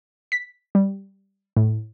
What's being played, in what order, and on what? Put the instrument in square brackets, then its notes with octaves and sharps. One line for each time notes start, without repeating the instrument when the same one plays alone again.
[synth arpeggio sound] B6
G3
A2